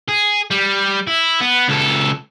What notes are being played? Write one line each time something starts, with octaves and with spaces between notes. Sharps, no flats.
G#4
G3
E4
B3
C#2 A4